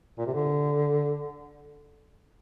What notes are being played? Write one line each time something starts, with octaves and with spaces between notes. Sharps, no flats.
A#2
C3
D3